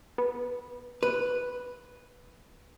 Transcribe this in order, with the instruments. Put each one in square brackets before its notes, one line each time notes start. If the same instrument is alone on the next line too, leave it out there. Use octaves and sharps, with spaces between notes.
[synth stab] B3
[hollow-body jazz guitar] B4